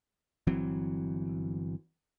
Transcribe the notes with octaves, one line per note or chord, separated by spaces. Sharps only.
G1 E3 F#3 C4